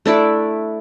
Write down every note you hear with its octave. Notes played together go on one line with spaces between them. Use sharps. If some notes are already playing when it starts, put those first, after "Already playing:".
A3 D4 E4 D5